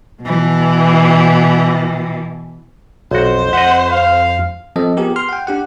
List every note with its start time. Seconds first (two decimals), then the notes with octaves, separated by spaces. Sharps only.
0.22 B2 E3
3.11 B1 F2 F#4 C5
3.53 D#5 E5 F#5
3.91 F5
4.76 F3 C4 A4 D#5
4.97 B3 F4 G4 G#4 A#4
5.16 C6 F6
5.29 F#5 G5
5.47 D4 G4 F#5